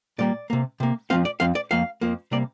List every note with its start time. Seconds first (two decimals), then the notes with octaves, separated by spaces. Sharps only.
0.18 A#2 G3 A#3 D5
0.50 C3 A#3
0.80 C3 A#3
1.10 F2 F3 C4 F5
1.25 D5
1.40 F2 F3 C4 F5
1.55 D5
1.71 F2 F3 A#3 F5
2.01 F2 F3 A#3
2.31 C3 G3 A#3 D5